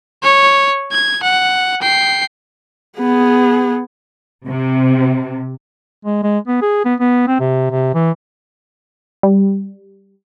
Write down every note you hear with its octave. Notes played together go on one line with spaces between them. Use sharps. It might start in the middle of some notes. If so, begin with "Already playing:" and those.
C#5
G#6
F#5
G5 C7
B3 G#4
C3
G#3
G#3
B3
G#4
B3
B3
C4
C3
C3
E3
G3